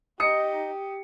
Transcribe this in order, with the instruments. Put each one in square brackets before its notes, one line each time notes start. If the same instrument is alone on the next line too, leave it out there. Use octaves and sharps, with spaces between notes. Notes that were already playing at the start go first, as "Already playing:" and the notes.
[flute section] D#4 D#5 [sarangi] G4 [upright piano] D#6 C#7